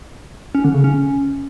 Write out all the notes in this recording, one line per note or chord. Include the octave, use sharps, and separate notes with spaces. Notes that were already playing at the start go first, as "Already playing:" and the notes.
C#4
D3
C#3
C#4